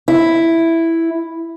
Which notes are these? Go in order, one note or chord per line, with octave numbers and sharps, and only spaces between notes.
E4